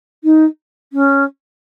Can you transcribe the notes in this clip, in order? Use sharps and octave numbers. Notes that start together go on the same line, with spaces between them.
D#4
C#4